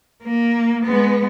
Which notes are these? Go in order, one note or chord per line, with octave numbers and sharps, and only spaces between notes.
A#3
G#3 B3